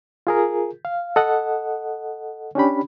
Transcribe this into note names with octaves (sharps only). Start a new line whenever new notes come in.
F4 G#4 A#4
F5
A4 D#5 F#5
C#4 D4 G4 B5